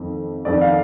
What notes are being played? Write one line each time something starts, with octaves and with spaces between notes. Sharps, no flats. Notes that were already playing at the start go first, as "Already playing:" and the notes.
Already playing: F2 D#3
F2 D#3 D5
F5